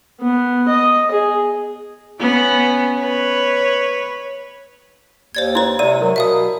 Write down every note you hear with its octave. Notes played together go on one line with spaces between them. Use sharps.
B3
D#5
G#4
B3 C#4
B4 C#5
D#2 C5 D5 G#6
E4 B4 C#5 C6
C3 G4 D5 E6 D#7
F#3 A#4
B2 E5 F5 D#6